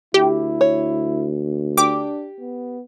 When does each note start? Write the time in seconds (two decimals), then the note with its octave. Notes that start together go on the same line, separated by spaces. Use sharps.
0.14 D2 E4 G4
0.61 C#5
1.78 D4 G4 D6
2.40 B3